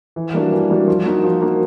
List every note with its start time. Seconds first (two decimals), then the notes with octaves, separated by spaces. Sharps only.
0.16 E3
0.34 G3 A#3 D4 F#4
0.52 E3
0.70 G3 A#3 D4 F#4
0.88 F3
1.05 A#3 D#4 F#4
1.24 F3
1.42 A#3 D#4 F#4